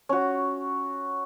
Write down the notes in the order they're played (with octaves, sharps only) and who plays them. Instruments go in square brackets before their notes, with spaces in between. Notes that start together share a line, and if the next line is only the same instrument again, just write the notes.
[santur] C#4 F#4